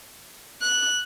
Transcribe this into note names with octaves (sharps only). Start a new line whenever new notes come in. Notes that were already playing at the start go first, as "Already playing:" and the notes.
F#6